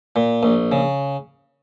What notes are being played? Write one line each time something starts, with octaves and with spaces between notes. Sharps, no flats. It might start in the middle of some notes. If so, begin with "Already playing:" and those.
A#2
A#1
C#3